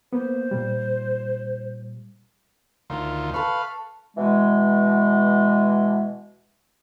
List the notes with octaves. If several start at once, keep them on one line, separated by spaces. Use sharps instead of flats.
A#3 B3 C5
A#2 G3
D2 D#3 F4
A4 B4 F5 C#6
B2 E3 G#3